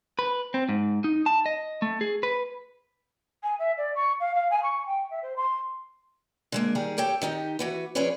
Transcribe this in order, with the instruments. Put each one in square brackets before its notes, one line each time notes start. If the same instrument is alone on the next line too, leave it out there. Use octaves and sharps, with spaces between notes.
[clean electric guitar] B4
C4
G#2
D#4
A5
D#5
A3
G#4
B4
[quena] G#5
E5
D5
C#6
F5
F5
G#5
C#6
G5
E5
C5
C6
[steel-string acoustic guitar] D3 G#3 A#3
D#3 G3 G#4
G4 A4 C#5 G5
D#3 D#4 G4
E3 F#4 B4
F3 C#4 G#4 B4 C#5 D5